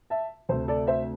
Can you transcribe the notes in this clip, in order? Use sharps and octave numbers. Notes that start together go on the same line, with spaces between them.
E5 A5
D2 C3 A3 C5
A4 D5
C5 E5